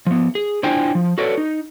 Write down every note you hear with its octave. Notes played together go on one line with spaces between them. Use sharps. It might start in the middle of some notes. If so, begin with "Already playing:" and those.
F3 B3
G#4
D4 E4 F4 C5 G5 G#5
F3
F#4 A4 B4 C#5 D5
D#4